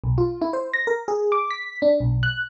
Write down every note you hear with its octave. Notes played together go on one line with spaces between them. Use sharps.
B1
F4
E4
C5
A#6
A#4
G#4
D6
B6
D4
B1
F#6